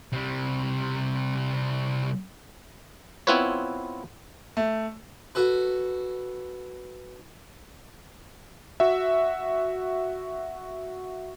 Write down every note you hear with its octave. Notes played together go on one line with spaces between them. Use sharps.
C3 G3
B3 C4 E4 F4 B4 C#5
A3
F#4 A4 B4
F#4 E5